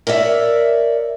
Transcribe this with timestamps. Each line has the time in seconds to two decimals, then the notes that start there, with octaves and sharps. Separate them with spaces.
0.07 A#4 C#5 D5 E5